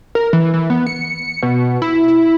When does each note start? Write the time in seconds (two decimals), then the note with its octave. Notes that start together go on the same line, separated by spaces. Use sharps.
0.15 A#4
0.33 E3
0.54 E3
0.70 B3
0.87 C#7
1.43 B2
1.82 E4
2.08 E4